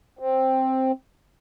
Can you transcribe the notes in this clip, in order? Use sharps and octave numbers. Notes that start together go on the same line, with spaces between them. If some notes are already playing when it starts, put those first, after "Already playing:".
C4